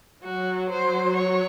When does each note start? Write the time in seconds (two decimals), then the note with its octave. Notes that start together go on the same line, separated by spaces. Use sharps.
0.23 F#3 F#4
0.70 C5
1.16 C#5